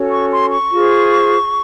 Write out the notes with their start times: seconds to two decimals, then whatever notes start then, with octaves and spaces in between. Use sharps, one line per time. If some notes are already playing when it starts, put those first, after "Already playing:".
Already playing: C#4 F#4 A4 C#5
0.12 C#6
0.32 C6
0.51 C#6
0.72 F4 G#4 C5